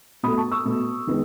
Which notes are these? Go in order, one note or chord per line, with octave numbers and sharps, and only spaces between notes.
B2 A3 B5 D#6
A5 C#6
C#6 E6
B2 A3
D#3 G#3 B3